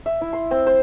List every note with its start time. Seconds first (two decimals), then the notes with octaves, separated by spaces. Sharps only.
0.06 E5
0.21 E4
0.33 C6
0.51 C4
0.66 C5